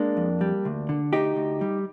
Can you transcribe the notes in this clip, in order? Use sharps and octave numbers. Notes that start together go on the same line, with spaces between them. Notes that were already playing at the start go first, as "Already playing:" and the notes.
Already playing: G#3 A#3 D4
F2
G3
D2
D3
D2 D#4 G4
D2
G3